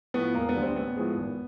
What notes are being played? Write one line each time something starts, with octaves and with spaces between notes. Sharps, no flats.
A2 F3 B3
E1 A#3
B3
D2 D3 G3
C4
A1 B3
A2 F3 G#3
G#1